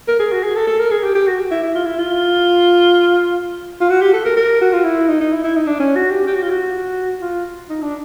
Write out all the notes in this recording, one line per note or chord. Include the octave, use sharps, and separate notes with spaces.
A#4
G#4
F#4
G#4
A4
A4
A#4
G#4
G4
G4
F#4
E4
E4
F4
E4
F4
F4
F#4
G4
A4
A#4
A#4
F#4
F4
E4
D#4
D#4
E4
E4
D#4
D4
C#4
F#4
G4
G4
F#4
F4
F#4
F4
D#4
D4